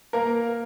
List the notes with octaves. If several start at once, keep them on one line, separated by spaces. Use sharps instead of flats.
A#3 A#4